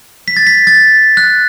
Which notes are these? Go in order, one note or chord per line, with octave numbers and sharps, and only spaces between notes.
B6
A6
B6
A6
F#6